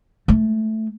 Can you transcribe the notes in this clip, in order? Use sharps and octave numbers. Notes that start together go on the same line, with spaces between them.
A3